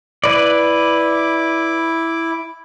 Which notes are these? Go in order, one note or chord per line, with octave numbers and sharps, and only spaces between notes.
E4 B4 D5 D6